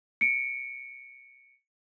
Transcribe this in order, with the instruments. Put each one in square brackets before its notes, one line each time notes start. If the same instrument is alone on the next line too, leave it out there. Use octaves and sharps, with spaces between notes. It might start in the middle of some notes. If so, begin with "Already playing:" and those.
[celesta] C#7 D7